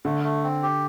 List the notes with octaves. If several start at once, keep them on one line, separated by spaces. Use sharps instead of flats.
D3 A3
A3
C4
G4